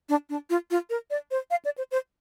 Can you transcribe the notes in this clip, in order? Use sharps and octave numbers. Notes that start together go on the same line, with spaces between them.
D4
D4
F4
F4
A#4
D5
C5
F5
D5
C5
C5